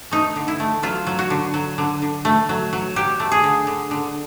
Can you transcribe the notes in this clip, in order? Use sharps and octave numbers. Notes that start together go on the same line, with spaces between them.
A3 D#4
D3
E4
A3
F#3 F4
F#3
F#4
D3
F#3
D3
D3
A3
F#3
F#3
F#3 G4
A3
G#4
D3
D3
D3